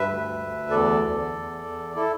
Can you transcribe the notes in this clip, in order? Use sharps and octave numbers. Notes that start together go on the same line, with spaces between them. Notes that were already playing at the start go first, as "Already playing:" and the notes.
Already playing: G2 B4 E5
D2
D2
E2 A4 D5
E2
E2
E2
E4 A4